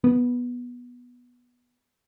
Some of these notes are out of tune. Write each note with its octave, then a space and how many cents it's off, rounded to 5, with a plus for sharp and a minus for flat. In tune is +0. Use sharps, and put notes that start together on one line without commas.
B3 -10